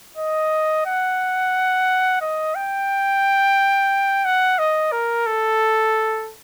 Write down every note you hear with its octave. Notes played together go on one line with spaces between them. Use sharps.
D#5
F#5
D#5
G5
F#5
D#5
A#4
A4